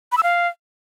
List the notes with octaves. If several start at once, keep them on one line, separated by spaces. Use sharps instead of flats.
B5
E6
F5